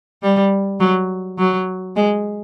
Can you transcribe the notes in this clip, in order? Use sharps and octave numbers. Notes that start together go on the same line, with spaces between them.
G3
F#3
F#3
G#3